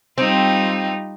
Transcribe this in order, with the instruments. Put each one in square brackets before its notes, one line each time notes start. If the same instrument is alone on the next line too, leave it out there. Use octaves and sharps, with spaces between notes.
[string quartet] G3 D#4 F4 [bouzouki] C4